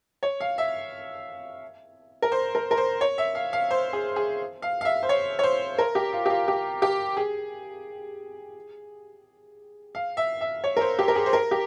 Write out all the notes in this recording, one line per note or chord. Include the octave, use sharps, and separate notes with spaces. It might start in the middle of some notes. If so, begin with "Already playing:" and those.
C#5
F5
E5
A#4
C5
A#4
A#4
C5
C#5
E5
F5
F5
C5
G#4
G#4
F5
F5
E5
C5
C#5
C#5
C5
A#4
G4
F4
G4
F4
G4
G4
G#4
F5
E5
E5
C#5
A#4
C5
G4
A#4
G#4
C5
A#4
G4